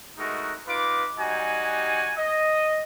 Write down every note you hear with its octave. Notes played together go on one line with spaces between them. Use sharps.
G#3 A3 D#4 F#4 A#4
D#4 F4 B4 D6
G3 D#4 F#4 G#5
D#5